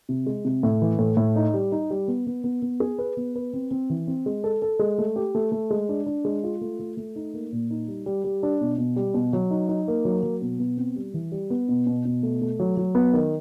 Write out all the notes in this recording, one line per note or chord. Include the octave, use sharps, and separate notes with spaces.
C3
G#3
C3
A2
E3
A2
A2
D#4
G3
D#4
G3
B3
B3
B3
B3
G#4
B4
B3
B4
C4
C4
E3
C4
G#3
A4
A4
G#3
A3
G4
A3
A3
G#3
D4
D4
G#3
F4
A3
A3
A3
D#4
A#3
A#2
D#4
G3
G3
G3
D4
B2
B2
G3
B2
F#3
D#4
D#4
A#3
F#3
F#3
B2
B3
C4
G3
E3
G3
B3
B2
B2
B2
A3
A3
F#3
F#3
B3
D#3